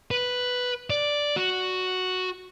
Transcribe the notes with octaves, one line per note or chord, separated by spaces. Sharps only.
B4
D5
F#4